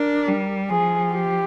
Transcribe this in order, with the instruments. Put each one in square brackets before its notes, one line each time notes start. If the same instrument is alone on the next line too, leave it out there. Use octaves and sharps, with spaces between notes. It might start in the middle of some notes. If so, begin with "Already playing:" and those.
Already playing: [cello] D4 [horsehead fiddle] A#4
[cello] G3
[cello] F3 [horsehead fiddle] G#4
[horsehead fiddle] G4